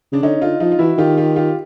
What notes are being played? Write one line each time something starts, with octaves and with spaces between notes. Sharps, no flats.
C#3 D4
D3 C#4 D#4
D3 D#4 F4
F3 D#4 F4
F4
E3 E4 F#4
D#3 F4 G4
F4 G4
F4 G4